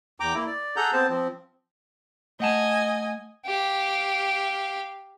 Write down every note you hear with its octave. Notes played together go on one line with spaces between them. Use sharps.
E2 G5 A#5 D6
A#3 E4
D5
G#4 A4 F#5 A#5 G6
B3 C4 C5 A5
F3 C4
A3 D#5 F#5 G#5 A5
G4 F5